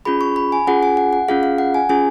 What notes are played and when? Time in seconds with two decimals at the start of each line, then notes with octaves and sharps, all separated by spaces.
0.05 C#4 F4 G#4 B5
0.21 C#6
0.36 B5
0.52 G#5
0.67 C#4 F4 G#4 F#5
0.83 G#5
0.97 F#5
1.13 F#5
1.28 C#4 F4 G#4 F5
1.43 F5
1.58 F#5
1.74 G#5
1.89 C#4 F4 G#4 G#5